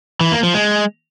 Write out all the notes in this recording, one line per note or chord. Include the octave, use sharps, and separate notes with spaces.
E3
A#3
F3
G#3